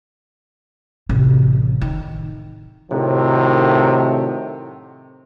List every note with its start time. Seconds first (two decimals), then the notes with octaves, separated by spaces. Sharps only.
1.09 A1 C3
1.82 D#3
2.90 A2 C3 D#3 F#3